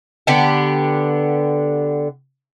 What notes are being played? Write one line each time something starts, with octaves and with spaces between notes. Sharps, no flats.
D3 B3 G4